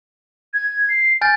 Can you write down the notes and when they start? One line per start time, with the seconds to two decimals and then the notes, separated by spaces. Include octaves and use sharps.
0.54 G#6
0.89 C7
1.21 G#5 F6 G6 A6